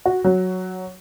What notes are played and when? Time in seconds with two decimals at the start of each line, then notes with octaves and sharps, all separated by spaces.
0.06 F#4
0.24 F#3